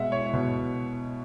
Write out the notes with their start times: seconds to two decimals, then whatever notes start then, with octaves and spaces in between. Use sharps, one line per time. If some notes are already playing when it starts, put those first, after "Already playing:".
Already playing: B2 G#3 E5 F#5
0.12 E4 C#5
0.33 B2